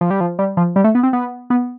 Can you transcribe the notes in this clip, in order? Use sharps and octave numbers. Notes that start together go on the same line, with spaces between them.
F3
G3
F3
G3
F3
G3
A3
B3
C4
B3
B3